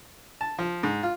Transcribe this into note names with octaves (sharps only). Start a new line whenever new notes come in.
A5
F3
G#2
F4